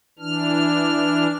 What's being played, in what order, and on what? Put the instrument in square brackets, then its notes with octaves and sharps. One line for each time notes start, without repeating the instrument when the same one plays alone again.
[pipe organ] E3 D4 F6